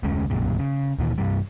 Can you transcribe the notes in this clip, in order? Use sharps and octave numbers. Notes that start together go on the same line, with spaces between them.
F1 D2 G#3 C#4
B1 F#2 A#2 C#3
C#3
D2 A#2 D#3 E3
G2 C3 E3 G3